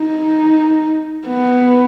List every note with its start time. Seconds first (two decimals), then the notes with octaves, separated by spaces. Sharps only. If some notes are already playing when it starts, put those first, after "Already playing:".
Already playing: D#4
1.27 B3